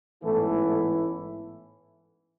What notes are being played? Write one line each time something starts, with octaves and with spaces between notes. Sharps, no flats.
A1 G#2 E3 A3 B3 E4 A4
A3 A4